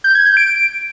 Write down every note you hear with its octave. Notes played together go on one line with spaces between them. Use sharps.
G6
G#6
G6
D7